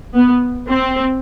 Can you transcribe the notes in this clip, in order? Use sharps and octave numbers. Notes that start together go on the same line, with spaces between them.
B3
C4